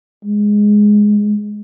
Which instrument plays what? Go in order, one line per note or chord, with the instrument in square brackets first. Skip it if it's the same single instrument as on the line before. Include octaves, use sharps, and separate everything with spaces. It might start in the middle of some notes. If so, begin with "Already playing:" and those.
[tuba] G#3